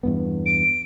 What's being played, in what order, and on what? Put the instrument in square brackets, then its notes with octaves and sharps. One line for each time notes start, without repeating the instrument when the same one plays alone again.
[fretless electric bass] E2 G2 B3
[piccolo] D7